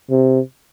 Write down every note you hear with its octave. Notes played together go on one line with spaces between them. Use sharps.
C3